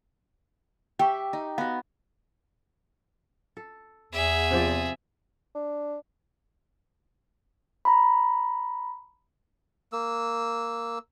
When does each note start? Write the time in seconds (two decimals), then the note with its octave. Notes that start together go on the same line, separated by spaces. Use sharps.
0.99 G4 E5 G5 C#6
1.33 D#4
1.58 B3 F#4 F5
3.57 A4
4.13 E2 G#4 E5
4.51 C3 F3 D5
5.55 D4
7.85 A#5 B5
9.93 A#3 E6